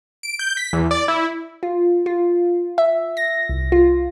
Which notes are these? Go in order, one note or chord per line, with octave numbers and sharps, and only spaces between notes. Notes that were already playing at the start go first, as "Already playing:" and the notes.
D7
G6
B6
E2
D5
E4
F4
F4
E5
A#6
C2
F4